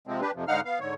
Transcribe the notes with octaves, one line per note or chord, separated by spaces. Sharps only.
C3 F3 G#3 C4
D4 G4 B4
F2 C3 F3
G#2 D3 D#4 F5 F#5 F6
B3 F5
G#2 D3 C#5